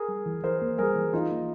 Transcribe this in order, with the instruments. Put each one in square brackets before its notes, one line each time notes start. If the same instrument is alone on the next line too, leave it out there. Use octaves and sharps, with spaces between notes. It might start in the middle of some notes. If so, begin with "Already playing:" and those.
Already playing: [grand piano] G#4 A#4
[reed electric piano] G3
E3
[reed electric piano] E3 [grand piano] A#4 C5
[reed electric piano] A#3
[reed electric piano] G3 [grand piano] G#4 A#4
[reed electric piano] E3
[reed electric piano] E3 [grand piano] D#4 F4
[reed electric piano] A#3